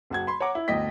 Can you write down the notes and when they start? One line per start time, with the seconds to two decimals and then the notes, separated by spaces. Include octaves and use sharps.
0.10 F#1 F#4 G#6
0.27 B5 C6
0.40 C#5 F#5 A#5 D6
0.55 E4
0.68 G1 D2 D#5 G5 B6